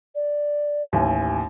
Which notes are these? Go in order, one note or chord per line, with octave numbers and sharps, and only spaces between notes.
D5
A1 D#2 G#5